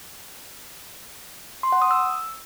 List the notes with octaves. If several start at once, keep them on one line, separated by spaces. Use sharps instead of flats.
C6
F#5
D#6
E6